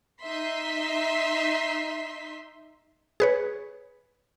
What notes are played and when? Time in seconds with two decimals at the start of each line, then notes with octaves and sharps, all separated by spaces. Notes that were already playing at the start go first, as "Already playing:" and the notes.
0.21 D#4 E5 C6 B6
3.20 G#4 B4 C#5